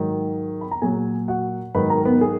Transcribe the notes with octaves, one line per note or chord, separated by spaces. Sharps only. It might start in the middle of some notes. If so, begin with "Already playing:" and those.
Already playing: G#2 D#3 F#3
B5
A#5
A#2 F#3 G#4 G#5
F#4 F#5
G#2 D#3 F#3 B4 B5
A#4 A#5
A#4
B3 B4
G#4